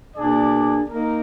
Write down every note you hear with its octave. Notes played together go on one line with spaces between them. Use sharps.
B2 A#3 D4 G#4 D5
A#3 D#4 A#4